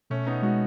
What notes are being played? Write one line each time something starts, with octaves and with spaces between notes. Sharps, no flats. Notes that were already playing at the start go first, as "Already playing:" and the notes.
B2 A3 C#4
B3 D#4
G#3 D#4 F#4